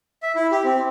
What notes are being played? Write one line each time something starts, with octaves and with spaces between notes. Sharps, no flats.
E5
E4
G4
C4